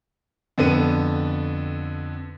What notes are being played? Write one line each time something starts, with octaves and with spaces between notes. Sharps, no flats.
F2 D3 B3 D#7